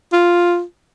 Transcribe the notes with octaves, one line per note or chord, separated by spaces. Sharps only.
F4